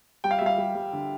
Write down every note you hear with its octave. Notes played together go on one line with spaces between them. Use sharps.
G3 G5
F5
E5
G3 F5
G3
G3
D3